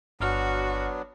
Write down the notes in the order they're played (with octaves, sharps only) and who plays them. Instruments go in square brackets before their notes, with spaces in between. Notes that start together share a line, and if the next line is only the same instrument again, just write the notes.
[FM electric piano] G1 F6 [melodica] F#3 B3 D4 [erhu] F#4